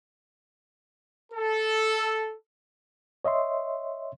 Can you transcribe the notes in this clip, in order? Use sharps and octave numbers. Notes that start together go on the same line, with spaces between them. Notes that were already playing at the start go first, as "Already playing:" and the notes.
A4
C#5 D#5 E5 C6